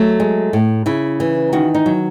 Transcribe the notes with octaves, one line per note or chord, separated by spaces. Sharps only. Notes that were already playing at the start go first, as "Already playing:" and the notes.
Already playing: F#3 A3
G#3
A2
C#3 E4
E3
D#3 F#4
D#4
F#3